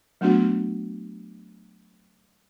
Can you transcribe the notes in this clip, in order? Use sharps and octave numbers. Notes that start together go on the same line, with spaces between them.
F#3 A3 B3 D4 F#4